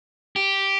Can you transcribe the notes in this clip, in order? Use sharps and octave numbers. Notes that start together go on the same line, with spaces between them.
G4